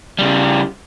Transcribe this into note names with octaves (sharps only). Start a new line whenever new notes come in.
C#3 G3